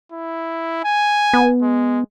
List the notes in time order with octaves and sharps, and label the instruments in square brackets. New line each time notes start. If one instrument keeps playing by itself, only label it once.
[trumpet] E4
G#5
[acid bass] B3
[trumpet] G#3